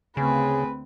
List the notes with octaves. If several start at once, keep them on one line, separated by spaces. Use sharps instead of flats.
D2 C#3 C4 G#4 B4